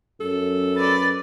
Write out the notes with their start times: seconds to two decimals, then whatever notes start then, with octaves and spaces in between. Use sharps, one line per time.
0.21 F#2 A4
0.76 B4 D5 A6